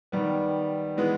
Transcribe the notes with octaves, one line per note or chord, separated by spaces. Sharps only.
D#3 G3 B3
E3 G#3 B3